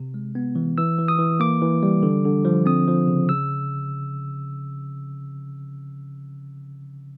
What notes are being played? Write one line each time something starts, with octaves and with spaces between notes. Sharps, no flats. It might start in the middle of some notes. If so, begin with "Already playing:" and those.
Already playing: C3
G#3
B3
E3
E3 E6
E3
D#6
E3
A#3 D6
E3
G3
D3
D3
F3
C4 D#6
F3
C#3
C#3 E6